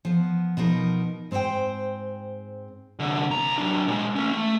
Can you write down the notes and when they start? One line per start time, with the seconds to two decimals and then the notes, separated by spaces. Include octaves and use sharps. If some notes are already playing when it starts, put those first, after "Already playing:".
0.05 F3 B3
0.57 B2 F3 D#4 A#4
1.31 G#2 C4 D4 C5 G5
2.99 C2 D3
3.31 C2 A#5
3.58 F#3 D4
3.88 A#2 G#3
4.16 A3 C#4
4.32 A3